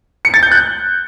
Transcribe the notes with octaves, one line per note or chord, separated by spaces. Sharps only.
C#7
A6
G6
F#6